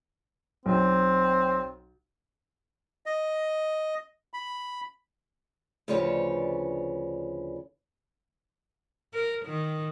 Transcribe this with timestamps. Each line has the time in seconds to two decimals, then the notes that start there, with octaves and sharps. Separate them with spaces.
0.66 B1 C4
3.06 D#5
4.34 B5
5.88 D2 C#3 F3 D4 B4 C#5
9.14 A#4
9.45 D#3